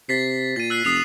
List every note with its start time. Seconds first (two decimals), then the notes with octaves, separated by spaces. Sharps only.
0.09 C3 A6 B6 C7
0.56 A#2 A6 D#7
0.70 E6 F#6 C7
0.85 F1 D#6 C7 F7